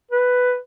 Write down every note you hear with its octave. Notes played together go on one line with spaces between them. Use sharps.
B4